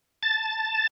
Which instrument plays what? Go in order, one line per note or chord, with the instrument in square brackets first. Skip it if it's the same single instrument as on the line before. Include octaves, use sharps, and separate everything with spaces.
[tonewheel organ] A5 A6